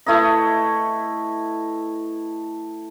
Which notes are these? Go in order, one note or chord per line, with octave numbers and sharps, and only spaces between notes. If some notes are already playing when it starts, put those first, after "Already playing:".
A3 E4 B4 D#5